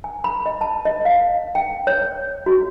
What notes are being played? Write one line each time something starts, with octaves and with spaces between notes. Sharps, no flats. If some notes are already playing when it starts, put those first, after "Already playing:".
G#5
B5
D#5
A5
D#5
F5
G5
C#5
F#4